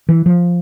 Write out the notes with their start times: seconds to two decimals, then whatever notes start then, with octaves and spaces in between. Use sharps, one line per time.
0.09 E3
0.26 F3